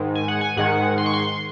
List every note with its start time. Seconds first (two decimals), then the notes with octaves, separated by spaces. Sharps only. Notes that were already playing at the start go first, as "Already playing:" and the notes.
Already playing: G#2 D#3 G#3
0.15 G#5
0.28 F#5
0.41 G#5
0.57 G#2 D#3 G#3 F#5
0.98 C6
1.06 C#6
1.13 C6